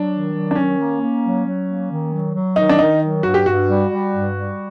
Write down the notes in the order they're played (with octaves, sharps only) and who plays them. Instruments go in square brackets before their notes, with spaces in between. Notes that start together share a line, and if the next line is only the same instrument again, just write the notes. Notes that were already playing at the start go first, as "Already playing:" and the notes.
Already playing: [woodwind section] F#3 [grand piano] D4
[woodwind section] D#3
F#3
[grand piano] D4
[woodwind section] D#3 [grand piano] C#4
[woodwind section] A#3
A#3
F#3
F#3
A#3
D#3
F#3
F#3
[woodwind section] D#3 [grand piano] D#4
[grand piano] D4
[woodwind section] D#3 [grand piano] D#4
[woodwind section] F#3
[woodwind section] G2 [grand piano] F#4
[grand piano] G4
[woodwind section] G2 [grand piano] F#4
[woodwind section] G3
G3
G2
G3